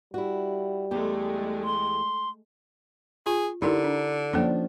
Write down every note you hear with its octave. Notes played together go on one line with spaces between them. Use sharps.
G3 E4 F#4
E2 G#3 A3 G4
C6
F4 G#4
D3 D#4 E4 G4 A#4
D4
F3 A#3 C#4 D4 A4 D5